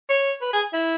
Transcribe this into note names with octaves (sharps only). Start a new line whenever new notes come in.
C#5
B4
G#4
E4